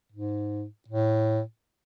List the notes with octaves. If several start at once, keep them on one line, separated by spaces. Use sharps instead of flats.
G#2
A2